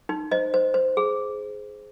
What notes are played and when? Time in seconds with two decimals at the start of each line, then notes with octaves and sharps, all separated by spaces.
0.09 D#4
0.31 C5 D#5
0.54 C5
0.74 C5
0.97 G#4